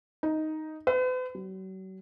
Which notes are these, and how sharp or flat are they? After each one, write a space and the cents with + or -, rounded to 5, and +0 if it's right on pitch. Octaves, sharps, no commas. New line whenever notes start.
D#4 +5
B4 +45
F#3 +40